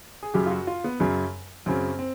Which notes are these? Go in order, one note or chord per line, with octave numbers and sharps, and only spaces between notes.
G#4
F#2 C#3 F#3 G4
F4
F#4
F4
B3
F#2 C#3 F#3
F#2 C#3 F#3 C4
C4